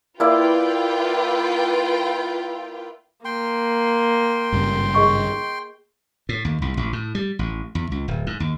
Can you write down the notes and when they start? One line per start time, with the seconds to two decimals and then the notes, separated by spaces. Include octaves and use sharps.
0.20 A#3 E4 F4 B4 D5 G5
3.25 A#3 G5 C6
4.52 G#1 G2 C#3
4.95 G#4 D#5 C#6
6.29 A2
6.45 D#2
6.62 C2
6.77 A1
6.93 A2
7.15 G3
7.39 A1
7.75 E2
7.92 C#2
8.08 D1
8.27 G#2
8.40 D#2